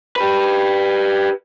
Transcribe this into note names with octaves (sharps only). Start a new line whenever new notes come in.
G4 B4